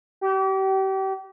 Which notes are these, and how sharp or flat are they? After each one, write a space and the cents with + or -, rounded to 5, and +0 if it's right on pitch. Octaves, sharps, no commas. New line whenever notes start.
G4 -35